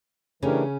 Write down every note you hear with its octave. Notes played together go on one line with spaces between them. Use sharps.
C#3 E3 A3 C#4 D4 G4 A#4